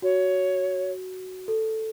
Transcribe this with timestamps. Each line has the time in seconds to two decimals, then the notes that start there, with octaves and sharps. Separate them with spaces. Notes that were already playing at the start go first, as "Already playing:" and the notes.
0.02 F#4 C#5
1.48 A4